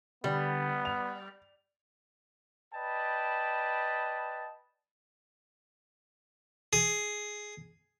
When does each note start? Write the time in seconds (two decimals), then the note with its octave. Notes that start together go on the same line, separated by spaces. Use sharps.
0.24 D3 G3 B3 D4
0.85 F7
2.74 B4 D5 D#5 G5 A5 B5
6.73 G#4